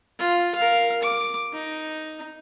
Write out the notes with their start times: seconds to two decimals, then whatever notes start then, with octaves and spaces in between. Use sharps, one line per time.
0.19 F4
0.55 A#4 F5
1.03 D6
1.54 D#4